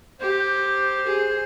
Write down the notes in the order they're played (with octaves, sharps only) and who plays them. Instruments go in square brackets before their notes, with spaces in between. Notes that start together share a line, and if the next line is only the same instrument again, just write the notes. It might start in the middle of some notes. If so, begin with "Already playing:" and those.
[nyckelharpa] G4 [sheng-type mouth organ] C5
[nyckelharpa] G#4